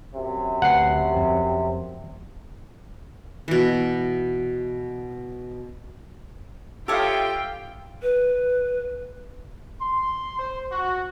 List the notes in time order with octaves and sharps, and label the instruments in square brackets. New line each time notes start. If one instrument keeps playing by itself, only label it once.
[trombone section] F#2 C3
[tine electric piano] D2 B4 C7 [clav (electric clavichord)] F#5
[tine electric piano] F2
[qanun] B2 E3
[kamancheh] F4 E5 [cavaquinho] G4 C#5 D#6 [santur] A4 F5 [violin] G5
[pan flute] B4
[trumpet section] C6
C5
F#4